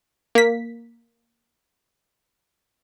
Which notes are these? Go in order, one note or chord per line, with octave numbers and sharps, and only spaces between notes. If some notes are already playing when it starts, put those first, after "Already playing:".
A#3 B6